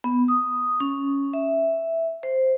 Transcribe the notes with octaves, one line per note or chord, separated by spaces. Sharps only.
B3
D#6
C#4
E5
C5